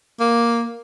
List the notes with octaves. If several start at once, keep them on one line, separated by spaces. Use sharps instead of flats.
A#3